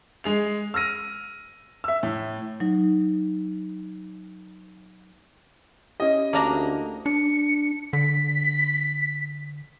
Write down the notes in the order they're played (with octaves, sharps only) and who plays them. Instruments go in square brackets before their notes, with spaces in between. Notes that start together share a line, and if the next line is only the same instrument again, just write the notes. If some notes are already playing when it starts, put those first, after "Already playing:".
[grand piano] G#3 G#4 F7
E6 F6 A#6 D#7
E5 E6
A2
[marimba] F#3 D#4
[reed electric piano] C#4 E4 G4 [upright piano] D#5
[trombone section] D2 [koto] A#3 D4 A#5
[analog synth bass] D4 [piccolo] C#7
[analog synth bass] D3 [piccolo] B6